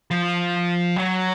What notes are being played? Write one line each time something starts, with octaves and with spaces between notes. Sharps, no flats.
F3
F#3